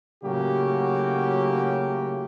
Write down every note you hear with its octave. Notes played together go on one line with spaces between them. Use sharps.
A2 C#3 F#3 A#3 F#4 G4